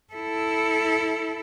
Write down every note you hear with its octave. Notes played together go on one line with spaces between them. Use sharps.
E4 A4